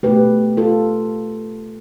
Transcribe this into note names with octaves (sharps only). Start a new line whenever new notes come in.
B2 A3 G4 B4
F4 A4